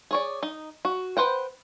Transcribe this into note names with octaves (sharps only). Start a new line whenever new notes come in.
G#4 C#5 D5
D#4
F#4
B4 C5 F#5 G5